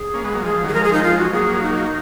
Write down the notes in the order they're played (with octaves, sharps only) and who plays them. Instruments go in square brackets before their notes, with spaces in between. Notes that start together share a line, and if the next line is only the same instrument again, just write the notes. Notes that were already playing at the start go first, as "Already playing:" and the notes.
Already playing: [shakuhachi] G#4
[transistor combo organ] A#3 C#4
G#3 B3
F#3 A#3
[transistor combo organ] F3 G#3 [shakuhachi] G#4
[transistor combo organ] F3
[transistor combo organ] D#3 F#3 [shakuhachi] G#4
[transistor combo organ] F3 G#3 [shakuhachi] A#4
[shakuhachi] G#4
D#4
F4
F#4
[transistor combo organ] F#3 A#3 [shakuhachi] G#4
[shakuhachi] D#4